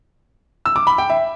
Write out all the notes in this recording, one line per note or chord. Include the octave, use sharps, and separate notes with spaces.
E6
D6
B5
G5
E5